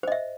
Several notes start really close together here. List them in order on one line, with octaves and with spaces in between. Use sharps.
C5 D#5 E5